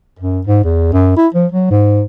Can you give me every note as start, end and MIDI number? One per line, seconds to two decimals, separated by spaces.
0.19 0.41 42
0.47 0.59 44
0.64 0.88 40
0.93 1.13 42
1.17 1.28 64
1.34 1.47 53
1.52 1.69 54
1.71 2.02 44